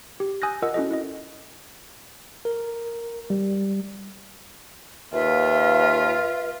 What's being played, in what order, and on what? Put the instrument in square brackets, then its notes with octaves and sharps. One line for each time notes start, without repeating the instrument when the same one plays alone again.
[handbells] G4
G#5 D#6 E6 F#6 G6 A#6
F4 A#4 D#5 F#5 E6
C#4 E4 F#4 A4 D#5
E4 D#5
[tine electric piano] A#4
G3
[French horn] D#2 [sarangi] F4 [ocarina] B4 [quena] E5